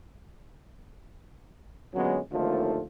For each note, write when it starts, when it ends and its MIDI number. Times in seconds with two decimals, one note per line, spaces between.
1.95 2.19 46
1.95 2.19 50
1.95 2.19 54
1.95 2.19 56
1.95 2.19 59
1.95 2.19 61
2.31 2.83 32
2.31 2.83 39
2.31 2.83 50
2.31 2.83 53
2.31 2.83 57
2.31 2.83 65